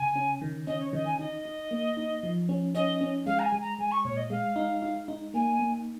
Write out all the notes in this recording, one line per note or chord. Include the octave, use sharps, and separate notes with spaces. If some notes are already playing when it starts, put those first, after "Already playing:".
Already playing: C#3 G#5
C#4
D#3
C#4 D#5
C#5
D#3 D#5
G#5
D#4 D#5
D#4
A#3
D#4
F3
C#4
C#4 D#5
C#4
G#3 F5
A#5
G#5
G#3
A#5
G#3 G#5
C#6
A#2 C#5
D#5
G#3 F5
D#4
D#4
D#4
A#3 G#5
A#3